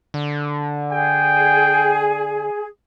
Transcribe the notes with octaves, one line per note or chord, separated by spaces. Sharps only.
D3
G#4 G5